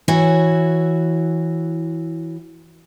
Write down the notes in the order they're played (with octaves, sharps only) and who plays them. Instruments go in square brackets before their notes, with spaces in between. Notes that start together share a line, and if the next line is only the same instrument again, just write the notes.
[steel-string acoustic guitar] E3 E4 F#4 C#5